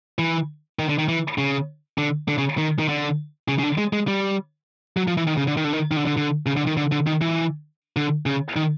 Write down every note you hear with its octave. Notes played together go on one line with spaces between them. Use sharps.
E3
D#3
D3
D#3
E3
C#3
D3
D3
C#3
D#3
D#3
D3
C#3
C#3
D3
G#3
G#3
G3
F#3
F3
E3
D#3
C#3
D3
D#3
D3
D#3
D#3
D3
D3
D3
C#3
D3
D#3
D3
D3
D#3
E3
D3
C#3
D#3